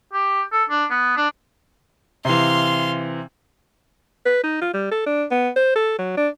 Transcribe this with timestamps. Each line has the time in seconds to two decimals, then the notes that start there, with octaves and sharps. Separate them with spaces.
0.13 G4
0.52 A4
0.70 D4
0.90 B3
1.17 D4
2.25 C3 E3 F5 C6
4.26 B4
4.44 D#4
4.61 F4
4.74 G3
4.91 A4
5.06 D4
5.31 B3
5.56 C5
5.76 A4
5.99 F#3
6.17 D4